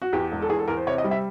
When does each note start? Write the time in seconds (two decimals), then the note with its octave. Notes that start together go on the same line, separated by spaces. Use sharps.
0.02 F#4
0.13 E2 G4
0.32 E1
0.42 A4
0.49 E2 G#4
0.59 A4
0.68 E2 A#4
0.77 C5
0.87 C3 C#5
0.98 D#5
1.04 G3
1.11 E5